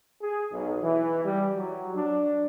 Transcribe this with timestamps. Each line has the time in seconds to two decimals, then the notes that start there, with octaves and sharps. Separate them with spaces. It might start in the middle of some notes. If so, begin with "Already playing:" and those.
0.22 G#4
0.52 B1
0.82 E3
1.23 G3
1.55 F#3
1.95 D4